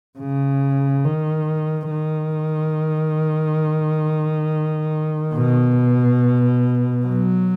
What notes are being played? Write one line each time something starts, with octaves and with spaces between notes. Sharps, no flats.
C#3
D#3
D#3
B2
F#3